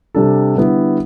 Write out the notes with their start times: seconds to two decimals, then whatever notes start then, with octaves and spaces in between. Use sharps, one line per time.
0.15 C3 G3 D4 A4
0.55 D3 G3 B3 E4